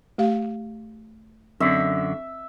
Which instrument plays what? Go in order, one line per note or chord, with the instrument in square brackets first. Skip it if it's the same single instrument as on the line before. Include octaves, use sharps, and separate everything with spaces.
[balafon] A3 G4 F5
[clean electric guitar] F#2 D3 [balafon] C4 [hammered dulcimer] E5